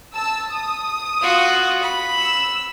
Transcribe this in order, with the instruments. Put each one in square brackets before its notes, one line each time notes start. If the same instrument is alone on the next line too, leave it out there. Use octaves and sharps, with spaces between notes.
[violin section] A5 E6
D#6
[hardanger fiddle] F4 F#4
B5
[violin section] E6